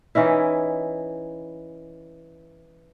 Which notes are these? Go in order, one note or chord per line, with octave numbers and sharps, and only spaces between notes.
E3 C#4 D#4 E4